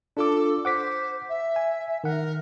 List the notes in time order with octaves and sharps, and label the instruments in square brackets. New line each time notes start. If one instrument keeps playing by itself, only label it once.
[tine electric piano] D4 F4 D6 [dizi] A4
[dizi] C5 [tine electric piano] F#5 D6 B6
[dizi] E5
[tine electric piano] G#5
[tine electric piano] D#3 F#5 [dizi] A#4